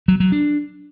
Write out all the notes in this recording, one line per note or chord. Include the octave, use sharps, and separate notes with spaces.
F#3
F#3
D4